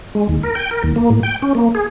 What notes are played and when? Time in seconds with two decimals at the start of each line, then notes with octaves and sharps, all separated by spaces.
0.15 G#3
0.29 D#2
0.43 A#4
0.55 G5
0.71 A#4
0.84 D#2
0.96 A#3
1.10 A2
1.23 G5
1.42 C#4
1.55 A#3
1.75 G#4